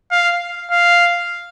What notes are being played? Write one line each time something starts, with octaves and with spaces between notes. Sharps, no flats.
F5
F5